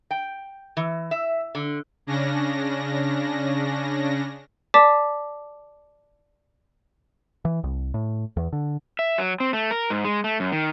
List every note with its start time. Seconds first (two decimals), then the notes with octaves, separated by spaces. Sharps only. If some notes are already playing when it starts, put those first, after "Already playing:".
0.11 G5
0.77 E3
1.11 E5
1.55 D3
2.07 C#3 C#4 D4 A#6
4.74 D5 A5 D6 B6
7.45 E3
7.64 C2
7.94 A2
8.37 E2
8.53 D3
8.99 E5
9.18 F#3
9.40 C4
9.53 A3
9.71 A#4
9.90 G#2
10.05 G#3
10.24 A3
10.40 F#2
10.52 D#3